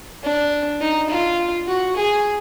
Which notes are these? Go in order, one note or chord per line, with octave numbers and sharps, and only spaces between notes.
D4
D#4
F4
F#4
G#4